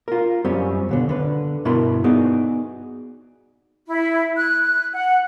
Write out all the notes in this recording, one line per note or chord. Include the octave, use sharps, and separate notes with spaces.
F4 A#4
F#2 G3 C4 C#4
D#2 B2 D3
D3 B4
G2 B2 E4 A#4 B5 C6
B3 D#4 F#4 G#4 D5
E4
F#6
F#6
F#5